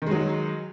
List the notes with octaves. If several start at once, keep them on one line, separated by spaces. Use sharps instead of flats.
D#3 F#3 G#3